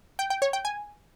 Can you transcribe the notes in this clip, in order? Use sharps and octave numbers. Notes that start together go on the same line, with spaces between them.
G5
G5
C#5
G5
G#5